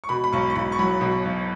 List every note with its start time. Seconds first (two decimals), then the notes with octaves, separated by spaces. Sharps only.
0.04 C#6
0.09 B2 B5
0.24 B5
0.32 B1 C#6
0.50 C#6
0.56 B1 B5
0.72 C#6
0.79 F#3 B5
1.01 B2
1.25 B1